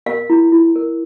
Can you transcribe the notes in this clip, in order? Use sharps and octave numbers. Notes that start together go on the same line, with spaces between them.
A#4 F5
E4
E4
A#4